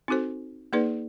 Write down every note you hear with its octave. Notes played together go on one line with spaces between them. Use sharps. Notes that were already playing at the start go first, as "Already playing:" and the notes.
C4 D#4 F#4 A4 C5
A#3 D#4 G#4 B4 D5